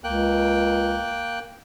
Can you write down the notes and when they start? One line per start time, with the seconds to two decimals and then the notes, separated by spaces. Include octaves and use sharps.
0.04 C#2 A#3 G5 F#6